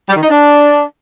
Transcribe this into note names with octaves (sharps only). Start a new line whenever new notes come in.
G3
D#3
D#4
D4